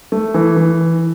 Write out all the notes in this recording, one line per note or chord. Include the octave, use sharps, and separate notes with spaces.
A3
E3
E3